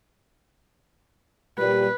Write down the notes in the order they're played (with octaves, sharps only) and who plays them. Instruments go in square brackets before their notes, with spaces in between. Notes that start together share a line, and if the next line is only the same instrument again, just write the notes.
[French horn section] A#2 G3 [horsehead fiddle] B4